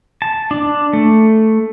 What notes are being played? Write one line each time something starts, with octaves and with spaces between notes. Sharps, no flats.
A5
D4
A3